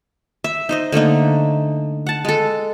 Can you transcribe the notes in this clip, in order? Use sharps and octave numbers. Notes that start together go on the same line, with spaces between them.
E5
D#4 C5 D#5
D3 A3 A#3 D#4
F#5 A5
G#3 A4